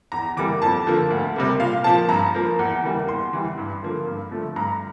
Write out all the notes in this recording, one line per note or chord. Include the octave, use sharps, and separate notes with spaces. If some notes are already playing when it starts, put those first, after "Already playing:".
E2 A#5
E3 G3 A#3 D6
F2 A5
D3 F3 A#3
D2
C3 G3 A#3
A#2 F5
F3 A#3 A5
G2 A#5
F3 A#3
E2
E3 G3 A#3
E2 C6
E3 G3
G2
D3 F3 A#3
G2
D3 F3 A3
G2 A#5